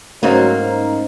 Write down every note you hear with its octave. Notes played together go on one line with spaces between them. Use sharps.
G#2 F#3 A3 A#3 C#4 C5
D#4